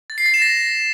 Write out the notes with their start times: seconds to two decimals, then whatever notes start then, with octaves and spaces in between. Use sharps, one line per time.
0.10 A6
0.18 C7
0.26 A6
0.34 E7
0.42 A#6